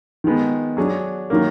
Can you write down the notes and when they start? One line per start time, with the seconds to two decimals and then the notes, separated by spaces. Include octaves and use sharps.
0.24 D#3 G#3 B3
0.77 F#3 D4 G#4
1.30 D#3 F#3 A#3